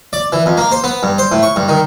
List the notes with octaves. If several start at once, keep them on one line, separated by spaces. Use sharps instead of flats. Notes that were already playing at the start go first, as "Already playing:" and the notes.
D5
E3
F2
A#3
C5
B3
G2
C5
A2
C#6
G2
D#3